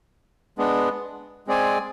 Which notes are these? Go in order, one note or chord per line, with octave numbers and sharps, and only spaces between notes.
G#3 B3 D4
G#3 C4 G#4 D5 G#5